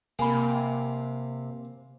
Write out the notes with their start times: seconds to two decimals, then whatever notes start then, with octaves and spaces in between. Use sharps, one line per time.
0.19 C3 A#3 G#5 B5